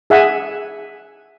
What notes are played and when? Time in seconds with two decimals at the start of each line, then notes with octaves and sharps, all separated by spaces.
0.10 G#4 E5 F#5 G#5